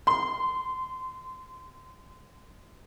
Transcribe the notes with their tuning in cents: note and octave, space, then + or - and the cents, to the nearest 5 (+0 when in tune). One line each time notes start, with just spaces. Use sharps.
C6 -20